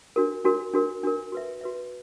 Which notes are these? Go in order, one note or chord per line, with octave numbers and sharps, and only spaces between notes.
D4 F#4 A#4
D4 F#4 A#4
D4 F#4 A#4
D4 F#4 A#4
F#4 B4 E5
F#4 B4 E5